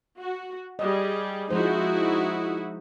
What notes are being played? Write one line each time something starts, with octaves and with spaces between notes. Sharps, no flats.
F#4
G3 G#4 D#5
F3 G#3 D#4 E4 F#4 C5